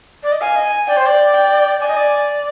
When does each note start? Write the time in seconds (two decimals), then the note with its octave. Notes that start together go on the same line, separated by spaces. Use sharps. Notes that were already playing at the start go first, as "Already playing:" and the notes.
0.23 D5
0.32 D#5
0.41 F5 G#5
0.56 D#5
0.87 D5 G5
0.97 C5
1.06 D5
1.33 G5
1.80 D5 G#5
1.88 D#5
1.97 D5